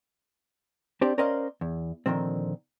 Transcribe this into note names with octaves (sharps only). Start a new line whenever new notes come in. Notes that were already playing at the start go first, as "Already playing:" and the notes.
C4 D4 G4 C5 D5
C#4 A#4 C5 D5 D#5 F5
E2
A#2 D3 D#3 F3 C4